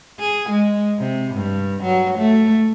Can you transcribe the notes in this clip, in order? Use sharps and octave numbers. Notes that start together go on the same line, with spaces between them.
G#4
G#3
C3
G2
F#3
A3